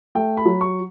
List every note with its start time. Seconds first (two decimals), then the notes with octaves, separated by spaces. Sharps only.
0.15 A3 G5
0.37 B5
0.45 F#3
0.61 C#6